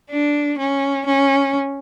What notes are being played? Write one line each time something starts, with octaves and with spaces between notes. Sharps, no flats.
D4
C#4
C#4